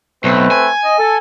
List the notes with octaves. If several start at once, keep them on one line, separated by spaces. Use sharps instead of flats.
B1 A3 C4 B4
G#5
D#5
A4